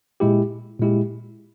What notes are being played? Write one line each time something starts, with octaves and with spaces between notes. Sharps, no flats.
A#2 G#3 E4 G4
A#2 G#3 E4 G4